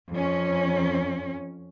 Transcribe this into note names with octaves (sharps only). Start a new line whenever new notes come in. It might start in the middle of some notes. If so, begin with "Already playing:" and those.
F2 C#4